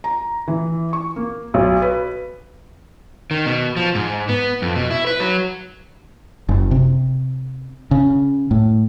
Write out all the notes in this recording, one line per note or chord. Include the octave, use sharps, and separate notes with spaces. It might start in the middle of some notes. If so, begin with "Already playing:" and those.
A#5
E3
C#6
A#3
B1
B4
D#3
B2
F3
G#2
B3
F2
B2
E4
B4
F#3
F#1
C3
C#3
A2